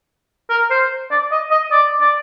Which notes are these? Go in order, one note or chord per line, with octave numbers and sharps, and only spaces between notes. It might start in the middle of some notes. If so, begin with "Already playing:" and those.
A#4
C5
D5
D#5
D#5
D5
D5